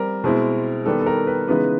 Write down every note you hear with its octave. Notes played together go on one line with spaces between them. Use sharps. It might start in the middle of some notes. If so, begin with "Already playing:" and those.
Already playing: G3 C4 A#4
B2 G#3 C4 E4
D#3 G3 B3 A4
A4
A#4
B4
C#3 E3 G#3 B3 D#4 B4